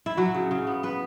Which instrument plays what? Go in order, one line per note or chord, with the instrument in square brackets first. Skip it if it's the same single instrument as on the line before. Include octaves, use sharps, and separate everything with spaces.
[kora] E4
F#3 F#4
C#3
C#3
B3
B3 B4